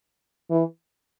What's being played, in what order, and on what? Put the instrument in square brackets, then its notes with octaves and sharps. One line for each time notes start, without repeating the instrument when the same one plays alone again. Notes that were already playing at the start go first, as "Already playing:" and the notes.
[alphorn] E3